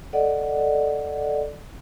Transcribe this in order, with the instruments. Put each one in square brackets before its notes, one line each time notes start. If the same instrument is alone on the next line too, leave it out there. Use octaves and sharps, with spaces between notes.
[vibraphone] A4 D5 D#5 F#5